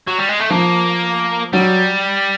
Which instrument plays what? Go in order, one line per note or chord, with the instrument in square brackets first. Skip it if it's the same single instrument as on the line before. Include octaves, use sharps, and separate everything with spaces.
[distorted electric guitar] F#3
G3
G#3
A3
[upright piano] F3 [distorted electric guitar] A#3
[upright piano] F#3 [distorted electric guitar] G3